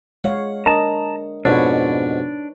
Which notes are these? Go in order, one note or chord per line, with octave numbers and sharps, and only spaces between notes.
G#3 C#5 F5 F#5
D4 A#4 D#5 A5 A#5
F2 G#2 B2 D4 D#4 B4 C#5